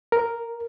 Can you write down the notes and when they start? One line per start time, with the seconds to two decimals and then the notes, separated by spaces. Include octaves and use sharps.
0.12 A#4